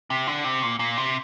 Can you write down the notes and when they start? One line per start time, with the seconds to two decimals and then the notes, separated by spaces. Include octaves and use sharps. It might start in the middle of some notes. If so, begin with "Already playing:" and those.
0.10 C3
0.27 D3
0.44 C3
0.63 A#2
0.79 A#2
0.97 C3